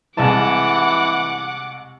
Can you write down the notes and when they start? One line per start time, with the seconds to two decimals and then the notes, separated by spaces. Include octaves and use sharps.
0.17 C2 E3 G#3 F#5 A5 D6